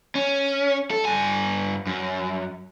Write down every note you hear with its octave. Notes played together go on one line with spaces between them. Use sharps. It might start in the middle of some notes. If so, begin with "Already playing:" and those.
C#4
A4
G2 G#5
F#2